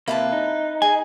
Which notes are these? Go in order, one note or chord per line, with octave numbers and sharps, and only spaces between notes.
C3 A#3 E4 B4 A5
D#4
G#4 G#5